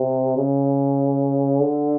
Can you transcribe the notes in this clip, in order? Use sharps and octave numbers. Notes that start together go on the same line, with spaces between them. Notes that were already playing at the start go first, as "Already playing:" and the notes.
Already playing: C3
C#3
D3